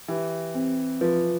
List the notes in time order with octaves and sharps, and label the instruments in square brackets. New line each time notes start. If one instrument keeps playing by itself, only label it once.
[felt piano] E3 [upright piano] G4
[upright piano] C4
[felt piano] F3 [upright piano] B4